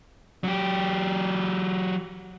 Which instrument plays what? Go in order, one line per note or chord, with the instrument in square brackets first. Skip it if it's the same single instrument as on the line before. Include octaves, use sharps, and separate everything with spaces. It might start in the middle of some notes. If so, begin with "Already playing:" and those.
[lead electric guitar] F#3 G4